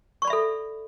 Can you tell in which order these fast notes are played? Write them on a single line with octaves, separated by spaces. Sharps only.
C#6 D5 B5 E5 A4